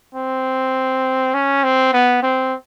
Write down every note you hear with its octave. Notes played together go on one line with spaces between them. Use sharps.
C4
C#4
C4
B3
C4